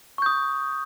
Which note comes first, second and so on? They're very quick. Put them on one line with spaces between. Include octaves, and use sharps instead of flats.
C#6 G6 D#6